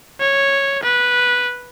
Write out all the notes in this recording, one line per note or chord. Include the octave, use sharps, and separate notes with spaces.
C#5
B4